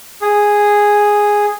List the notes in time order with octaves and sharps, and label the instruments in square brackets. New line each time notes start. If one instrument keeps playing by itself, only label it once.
[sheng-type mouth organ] G#4